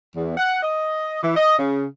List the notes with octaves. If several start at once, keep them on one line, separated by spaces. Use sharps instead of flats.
E2
F#5
D#5
E3
D#5
C#3